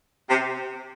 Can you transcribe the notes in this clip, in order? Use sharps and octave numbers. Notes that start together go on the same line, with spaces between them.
C3